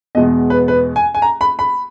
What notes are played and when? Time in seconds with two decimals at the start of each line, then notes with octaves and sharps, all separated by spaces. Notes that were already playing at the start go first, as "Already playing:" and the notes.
0.15 E2 B2 G#3 B3 D#5
0.50 B4
0.68 B4
0.96 G#5
1.15 G#5
1.22 A#5
1.41 B5
1.59 B5